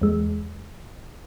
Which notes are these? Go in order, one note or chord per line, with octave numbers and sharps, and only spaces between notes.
E2 G#3